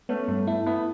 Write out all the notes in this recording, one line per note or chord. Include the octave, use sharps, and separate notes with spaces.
A3 B3 C#4
G2 A3
A3 E4
B3 E4